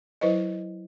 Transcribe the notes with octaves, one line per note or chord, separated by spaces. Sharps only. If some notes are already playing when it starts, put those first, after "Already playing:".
F#3 E4 B4 C5 D#5